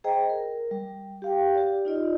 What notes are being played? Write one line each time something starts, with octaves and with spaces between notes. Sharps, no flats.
G#4 C5 D#5 G5 A#5
A#4
G3
G4 F5 G5
G4 D5
D#4 F4 D5 D#5